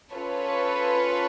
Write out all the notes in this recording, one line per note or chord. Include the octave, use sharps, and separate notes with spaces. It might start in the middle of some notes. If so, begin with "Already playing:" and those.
C#4 F4 A4 B4 C#5